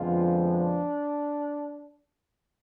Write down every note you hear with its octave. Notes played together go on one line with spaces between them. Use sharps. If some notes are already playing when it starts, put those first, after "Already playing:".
Already playing: F2 D3 F3 G#3 B3 F4
D4